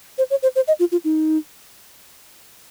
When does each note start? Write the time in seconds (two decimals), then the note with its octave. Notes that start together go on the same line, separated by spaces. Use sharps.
0.18 C5
0.30 C#5
0.43 C5
0.56 C5
0.68 D#5
0.80 F4
0.92 F4
1.04 D#4